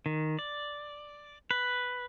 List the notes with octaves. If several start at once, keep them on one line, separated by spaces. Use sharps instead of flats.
D#3
D5
B4